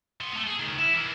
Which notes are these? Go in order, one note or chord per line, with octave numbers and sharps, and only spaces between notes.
B3 C6
A3 A#3
G#4
C#2 D#3
E4
E3 A#3